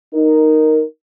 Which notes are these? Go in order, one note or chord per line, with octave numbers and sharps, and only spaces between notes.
D#4 A#4